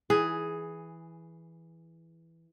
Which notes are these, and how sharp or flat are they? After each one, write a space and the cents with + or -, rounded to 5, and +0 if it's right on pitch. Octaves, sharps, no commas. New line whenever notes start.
E3 +0 G#4 +5